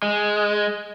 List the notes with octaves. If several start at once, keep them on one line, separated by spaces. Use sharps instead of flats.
G#3